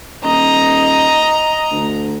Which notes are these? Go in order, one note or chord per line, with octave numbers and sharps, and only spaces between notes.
D#1 D#5 A#5
D2